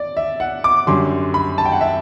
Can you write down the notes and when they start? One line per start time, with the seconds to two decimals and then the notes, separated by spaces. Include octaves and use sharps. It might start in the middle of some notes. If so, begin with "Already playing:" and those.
Already playing: D5
0.17 E5
0.40 F#5
0.64 D6
0.87 F#2 D3 G3 C6
1.34 B5
1.58 A5
1.65 G5
1.72 F#5
1.81 E5